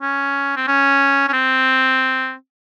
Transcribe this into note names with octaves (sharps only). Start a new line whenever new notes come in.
C#4
C4
C#4
C#4
C4